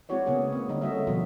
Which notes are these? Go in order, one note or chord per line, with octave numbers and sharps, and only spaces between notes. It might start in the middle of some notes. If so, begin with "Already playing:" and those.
G#3 C4 E4 F#4 C#5 D5
C#3 G#3 A#3 B3 C#4 G#4
A#3 C4
D3 G3 D#4
G#3 A3 C#4 F#4 D#5 E5
B2 D#3 F3 G3 F4